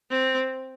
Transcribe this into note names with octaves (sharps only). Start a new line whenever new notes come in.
C4